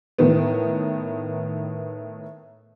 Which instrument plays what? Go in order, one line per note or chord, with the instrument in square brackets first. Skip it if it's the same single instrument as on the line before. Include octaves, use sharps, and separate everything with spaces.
[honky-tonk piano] A2 D#3 B3